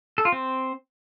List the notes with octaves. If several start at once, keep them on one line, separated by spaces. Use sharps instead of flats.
A4
F4
C4